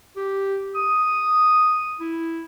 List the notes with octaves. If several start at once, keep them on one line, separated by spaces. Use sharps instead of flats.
G4
D#6
E4